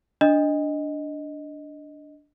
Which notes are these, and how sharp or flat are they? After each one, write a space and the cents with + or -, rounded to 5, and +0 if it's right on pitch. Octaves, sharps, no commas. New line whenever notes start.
D4 -5 D#5 +0